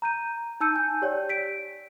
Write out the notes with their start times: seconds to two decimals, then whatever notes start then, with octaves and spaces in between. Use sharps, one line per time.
0.02 A#5 G6 D#7
0.60 D#4 A5 E6 G6 C#7 D#7
0.75 G#5 G6
1.02 G4 C#5 D5 G5
1.29 B6 D7